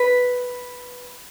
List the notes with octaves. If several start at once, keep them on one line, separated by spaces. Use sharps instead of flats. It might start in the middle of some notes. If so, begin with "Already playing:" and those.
Already playing: B4